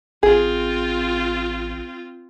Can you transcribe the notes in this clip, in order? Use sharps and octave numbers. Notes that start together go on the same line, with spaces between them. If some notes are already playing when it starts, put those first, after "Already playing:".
A1 C4 F4 G#4